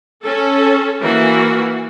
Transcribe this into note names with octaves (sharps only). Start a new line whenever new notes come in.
C#4 A4
E3 A#3 F#4